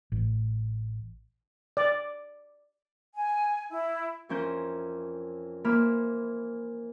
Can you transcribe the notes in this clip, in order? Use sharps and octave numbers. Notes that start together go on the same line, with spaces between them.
A1
D5
G#5
E4
F2 E3 C#4 A#4 C5 G6
E3 A#3 C5 B5 F6